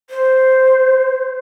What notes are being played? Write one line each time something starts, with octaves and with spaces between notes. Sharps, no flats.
C5